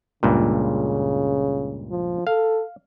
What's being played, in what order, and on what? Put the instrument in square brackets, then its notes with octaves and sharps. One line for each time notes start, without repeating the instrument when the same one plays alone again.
[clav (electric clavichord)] C#2 G2 A#2 [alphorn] C#3
[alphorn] F3
[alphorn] A4 [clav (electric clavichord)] F5